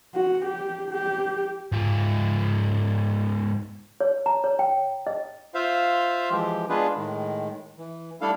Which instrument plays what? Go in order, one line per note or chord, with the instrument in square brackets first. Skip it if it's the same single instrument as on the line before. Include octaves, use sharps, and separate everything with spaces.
[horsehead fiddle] F#4
G4
G4
[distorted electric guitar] G#2 F4
[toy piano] C#5
A#5
C#5
G5
D#5
[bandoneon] F4 C5 E5 F5
E3 F3 G#3 G4
G#3 B3 D4 F4 G#4 B4
A2 D#3 G#3
E3
G3 A3 D4 E4 A4 F5